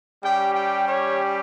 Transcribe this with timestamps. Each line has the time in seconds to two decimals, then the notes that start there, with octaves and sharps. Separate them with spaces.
0.23 G3 C#4 G4 G5
0.55 G5
0.88 C#5